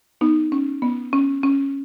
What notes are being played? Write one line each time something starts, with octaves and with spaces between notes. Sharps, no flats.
B3 D#4
C#4
B3
C#4
C#4